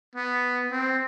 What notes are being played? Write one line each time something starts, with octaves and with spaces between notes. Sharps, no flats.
B3
C4